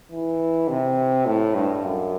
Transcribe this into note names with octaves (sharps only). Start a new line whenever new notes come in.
E3
C3
A2
G2
F#2